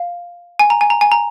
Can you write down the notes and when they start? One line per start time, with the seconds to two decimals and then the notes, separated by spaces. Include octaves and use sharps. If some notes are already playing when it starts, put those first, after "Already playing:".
Already playing: F5
0.59 G#5
0.70 A#5
0.81 G#5
0.90 A#5
1.01 G#5
1.12 A#5